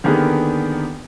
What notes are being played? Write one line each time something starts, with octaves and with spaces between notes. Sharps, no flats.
D3 D#3 A#3 B3 G4 G#4